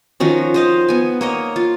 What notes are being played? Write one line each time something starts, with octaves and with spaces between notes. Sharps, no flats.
D#3 F3 C#4 F#4
C5 D#5 F5
B3 G#5
A#3 C#5 D#5
F4